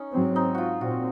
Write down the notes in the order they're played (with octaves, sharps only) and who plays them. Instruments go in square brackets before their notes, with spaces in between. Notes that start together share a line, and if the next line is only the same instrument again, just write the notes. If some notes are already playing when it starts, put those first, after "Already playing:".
Already playing: [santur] C#4 D#4
[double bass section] G#2 F#3 C4
[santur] D#4
F4 F#4
[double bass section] A#2 C4 [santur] F#4